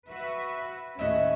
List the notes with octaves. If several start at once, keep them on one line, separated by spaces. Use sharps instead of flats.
F#4 B4 E5
D#2 A2 C#4 F#4 D#5 E5